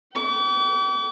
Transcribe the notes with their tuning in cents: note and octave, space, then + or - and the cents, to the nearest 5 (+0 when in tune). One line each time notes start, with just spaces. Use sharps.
G5 -35 D6 -40